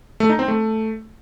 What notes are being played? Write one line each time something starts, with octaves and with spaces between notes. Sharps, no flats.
A3
D#4
C4
A3